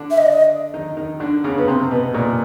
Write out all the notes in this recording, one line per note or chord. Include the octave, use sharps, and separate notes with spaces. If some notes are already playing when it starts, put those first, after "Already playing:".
Already playing: D3 D4
E5
D#5
D5
D#5
D#3 D#4
D#3 D#4
D3 D4
C#3 C#4
B3
C3 C4
B2 B3
A#2 A#3